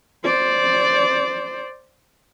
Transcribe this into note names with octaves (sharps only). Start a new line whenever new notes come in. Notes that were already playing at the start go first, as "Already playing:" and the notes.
C5 D5